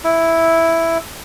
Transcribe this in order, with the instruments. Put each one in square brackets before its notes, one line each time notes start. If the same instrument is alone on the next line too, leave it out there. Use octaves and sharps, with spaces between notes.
[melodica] E4